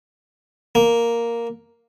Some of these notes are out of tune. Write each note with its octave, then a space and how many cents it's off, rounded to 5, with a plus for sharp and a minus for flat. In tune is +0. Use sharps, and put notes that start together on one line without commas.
A#3 +0